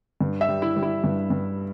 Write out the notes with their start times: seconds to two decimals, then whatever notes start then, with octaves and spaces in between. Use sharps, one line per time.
0.21 G2
0.41 E5
0.49 G3
0.62 E4
0.76 G3
0.83 E4
1.04 G2
1.30 G2